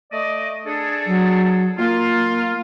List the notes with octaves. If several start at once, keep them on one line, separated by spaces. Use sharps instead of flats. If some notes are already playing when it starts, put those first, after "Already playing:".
A3 D5 D#5
D4 G#4 A4
F#3
A#3 F4